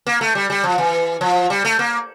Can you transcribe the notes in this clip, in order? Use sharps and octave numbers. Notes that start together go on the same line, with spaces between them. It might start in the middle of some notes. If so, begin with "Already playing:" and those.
A#3
A3
G3
G3
F3
E3
F3
G3
A3
A#3